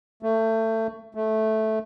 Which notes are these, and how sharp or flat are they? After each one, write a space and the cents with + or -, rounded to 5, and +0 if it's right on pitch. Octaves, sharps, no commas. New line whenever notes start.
A3 +25
A3 -10